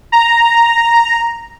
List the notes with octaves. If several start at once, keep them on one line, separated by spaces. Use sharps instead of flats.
A#5